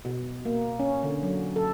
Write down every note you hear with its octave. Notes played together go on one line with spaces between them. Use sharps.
B2
A#3
C#4
D3
F#3
A4